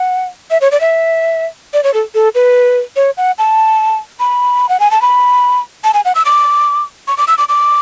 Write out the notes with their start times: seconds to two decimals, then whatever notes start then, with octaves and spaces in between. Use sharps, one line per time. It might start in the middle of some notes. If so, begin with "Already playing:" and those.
Already playing: F#5
0.50 E5
0.61 C#5
0.71 D5
0.80 E5
1.73 D5
1.84 C#5
1.94 A4
2.14 A4
2.35 B4
2.96 C#5
3.17 F#5
3.38 A5
4.20 B5
4.69 F#5
4.80 G#5
4.91 A5
5.02 B5
5.84 A5
5.94 G#5
6.05 F#5
6.15 E6
6.25 D6
7.07 C#6
7.17 D6
7.28 E6
7.38 D6
7.49 D6